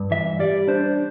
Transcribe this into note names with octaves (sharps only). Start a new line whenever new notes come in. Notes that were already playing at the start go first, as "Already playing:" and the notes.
Already playing: G2
E3 E5
G3 D5
D4 C5